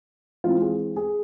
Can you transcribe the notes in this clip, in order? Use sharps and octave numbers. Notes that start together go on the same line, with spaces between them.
E3 G#3 C4 F4
G#4
G#4